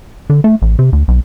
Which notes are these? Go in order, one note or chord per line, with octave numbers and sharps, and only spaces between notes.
D3
A3
A1
C3
D2
B1